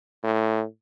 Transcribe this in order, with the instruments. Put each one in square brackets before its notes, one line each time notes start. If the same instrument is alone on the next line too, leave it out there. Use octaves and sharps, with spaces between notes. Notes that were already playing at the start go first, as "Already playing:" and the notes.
[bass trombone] A2